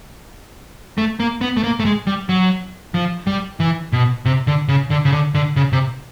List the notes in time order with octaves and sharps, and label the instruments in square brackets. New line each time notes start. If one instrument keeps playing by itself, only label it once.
[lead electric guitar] A3
A#3
B3
A3
A#3
A3
G#3
G3
F#3
F3
G3
E3
B2
C3
D3
C#3
D3
C#3
D3
D3
C#3
C3